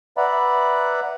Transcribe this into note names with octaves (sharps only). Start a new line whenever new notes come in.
B4 D5 E5 F#5 A#5 B5